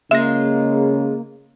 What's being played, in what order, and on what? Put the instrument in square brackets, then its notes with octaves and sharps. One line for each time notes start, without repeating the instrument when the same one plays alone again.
[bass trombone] C#3 [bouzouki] G#3 F4 [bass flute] A#3 [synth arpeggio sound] E5 A#6